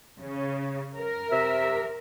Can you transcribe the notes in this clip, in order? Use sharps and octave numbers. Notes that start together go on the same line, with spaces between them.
C#3
A#4
C3 E5